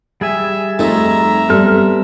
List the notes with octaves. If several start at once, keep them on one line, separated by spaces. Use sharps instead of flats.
G3 G#4 E5 G#5
F2 F3 A3 D#4 F4 E5 A#5
G3 B3 C4 A4 F6